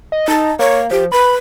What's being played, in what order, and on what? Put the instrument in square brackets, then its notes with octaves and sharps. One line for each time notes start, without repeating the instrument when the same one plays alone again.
[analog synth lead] D#5
[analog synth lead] D#4 [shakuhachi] A5
[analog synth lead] A#3 [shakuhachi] C#5
[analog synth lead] F3 [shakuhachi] G4
[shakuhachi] B4 [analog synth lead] B5